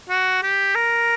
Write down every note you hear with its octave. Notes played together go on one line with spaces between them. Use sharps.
F#4
G4
A#4